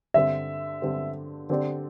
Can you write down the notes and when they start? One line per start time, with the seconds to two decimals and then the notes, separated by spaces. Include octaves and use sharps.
0.14 G2 D3 C4 E5
0.82 G2 D3 C4
1.49 D3 C4 G4 D5